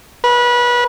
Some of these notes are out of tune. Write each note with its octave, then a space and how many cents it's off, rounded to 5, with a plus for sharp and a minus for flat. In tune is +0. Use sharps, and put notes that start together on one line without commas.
B4 -25